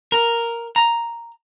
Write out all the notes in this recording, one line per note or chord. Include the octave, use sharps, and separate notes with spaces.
A#4
A#5